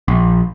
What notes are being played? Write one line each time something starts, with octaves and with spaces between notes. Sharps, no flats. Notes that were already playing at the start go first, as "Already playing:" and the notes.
A#1